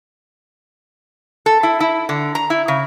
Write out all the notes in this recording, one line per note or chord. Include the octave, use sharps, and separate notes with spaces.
A4
E4
E4
D3
A#5
E4
C#3